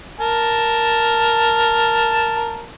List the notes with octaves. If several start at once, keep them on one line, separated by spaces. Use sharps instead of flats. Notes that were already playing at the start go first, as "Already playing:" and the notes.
A#4 A5